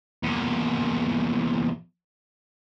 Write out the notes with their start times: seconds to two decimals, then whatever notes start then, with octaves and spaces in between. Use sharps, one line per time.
0.24 E2 A#2